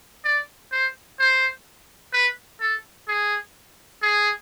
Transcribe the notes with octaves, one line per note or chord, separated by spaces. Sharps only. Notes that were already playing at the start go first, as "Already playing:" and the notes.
D5
C5
C5
B4
A4
G#4
G#4